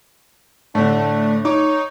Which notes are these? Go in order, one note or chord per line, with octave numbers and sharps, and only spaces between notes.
A2 D3 A3 D4
D#4 C#5 D6